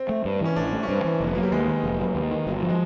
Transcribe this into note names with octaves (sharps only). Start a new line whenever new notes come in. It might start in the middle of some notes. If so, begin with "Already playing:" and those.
Already playing: C4
A3
G2
E3 C#4
A1 D4
A3
C#4
G2 C4
E3
F1 A#3
B3
F#3 A#3
G3
D#2 G#3
D#3
F1
F#3
D#2
D#3
G1 F#3
F3
G#3